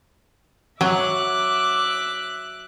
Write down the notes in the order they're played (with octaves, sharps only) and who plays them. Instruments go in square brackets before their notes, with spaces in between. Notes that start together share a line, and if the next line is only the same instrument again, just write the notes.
[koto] F#3 [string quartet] E5 D6 F#6